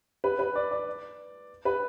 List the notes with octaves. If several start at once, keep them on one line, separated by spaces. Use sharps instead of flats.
B4
B4
D5
D5
B4